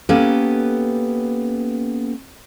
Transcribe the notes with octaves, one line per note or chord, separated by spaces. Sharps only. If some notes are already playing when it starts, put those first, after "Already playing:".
A#3 B3 C#4 G4 A4 B4